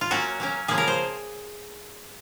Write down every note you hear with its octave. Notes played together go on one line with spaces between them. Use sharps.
F4
F#3 A#3 C#4 F#4
F#3 A#3 C#4
C#3 F3 A#3 G#4
A#4
C5